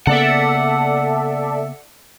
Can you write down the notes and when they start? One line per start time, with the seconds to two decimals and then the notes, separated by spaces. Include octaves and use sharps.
0.07 C#3 A#3 B3 A4 D5 E5 F#5